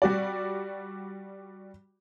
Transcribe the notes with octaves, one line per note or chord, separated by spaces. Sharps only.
G3 F#4 D5